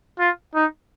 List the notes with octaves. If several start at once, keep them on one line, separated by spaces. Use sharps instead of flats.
F4
D#4